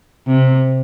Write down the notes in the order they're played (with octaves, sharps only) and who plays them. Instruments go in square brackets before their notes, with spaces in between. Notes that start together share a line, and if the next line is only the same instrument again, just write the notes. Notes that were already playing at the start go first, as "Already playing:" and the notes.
[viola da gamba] C3